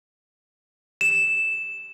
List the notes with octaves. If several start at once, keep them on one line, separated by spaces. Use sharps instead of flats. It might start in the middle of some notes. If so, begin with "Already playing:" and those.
E7